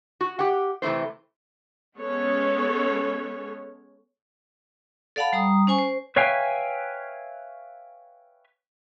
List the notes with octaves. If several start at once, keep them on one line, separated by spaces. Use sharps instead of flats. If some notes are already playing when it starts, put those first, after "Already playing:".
F#4
G4 F#5
C3 E3 A3 C4 C5
G#3 B3 C#4 A4 C#5
A4 D5 F5 F#5 A5 B5
G3 A#5 D#6
C#4 C5 G#5 C#6
C5
B4 C#5 E5 F5 G5 G#5